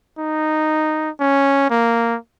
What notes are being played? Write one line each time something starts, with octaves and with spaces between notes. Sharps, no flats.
D#4
C#4
A#3